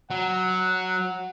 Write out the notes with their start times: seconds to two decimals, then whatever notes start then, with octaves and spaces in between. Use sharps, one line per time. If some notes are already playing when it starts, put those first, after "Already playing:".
0.10 F#3 F#5